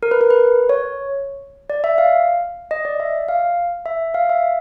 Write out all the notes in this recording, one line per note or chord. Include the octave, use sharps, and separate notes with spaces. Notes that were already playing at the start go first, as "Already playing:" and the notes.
A#4
B4
A#4
B4
C#5
D5
E5
F5
D#5
D5
E5
F5
E5
F5
E5